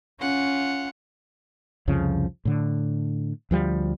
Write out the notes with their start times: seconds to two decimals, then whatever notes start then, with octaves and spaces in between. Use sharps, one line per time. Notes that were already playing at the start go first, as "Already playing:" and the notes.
0.20 C#4 F4 F#5
1.88 C2 F2 C#3 F3
2.45 A2 D3
3.51 D2 F3 G3